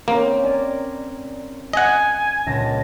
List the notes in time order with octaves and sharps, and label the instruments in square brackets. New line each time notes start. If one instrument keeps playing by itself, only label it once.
[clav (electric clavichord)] A#3 [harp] C4 C#4
[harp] A#4 D5 G#5
[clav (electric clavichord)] D#5 F#5 [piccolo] G#5 [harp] C7
[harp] C#2 A#2 A5 [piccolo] A#6